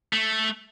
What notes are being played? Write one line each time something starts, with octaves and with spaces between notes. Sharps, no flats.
A3